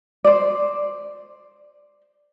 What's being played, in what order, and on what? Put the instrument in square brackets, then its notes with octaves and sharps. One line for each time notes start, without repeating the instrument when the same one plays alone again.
[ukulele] C5 D5